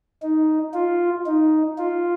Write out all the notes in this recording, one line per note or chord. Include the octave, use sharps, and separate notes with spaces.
D#4
F4
D#4
F4